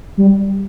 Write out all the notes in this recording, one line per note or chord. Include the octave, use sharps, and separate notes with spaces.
G3